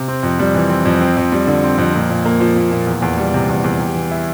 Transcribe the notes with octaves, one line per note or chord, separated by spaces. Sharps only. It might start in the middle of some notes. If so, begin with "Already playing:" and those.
Already playing: C3
C4
F2
G3
E3
C4
F2
C4
F2
G3
D3
C4
F2
A#2
A#2
A#3
F3
A#2
A#2
E2
E2
G3
C3
E2
E2
G4
E3
E4